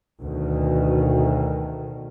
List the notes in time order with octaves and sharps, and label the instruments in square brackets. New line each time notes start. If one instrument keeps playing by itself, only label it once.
[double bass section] D2 B2 D#3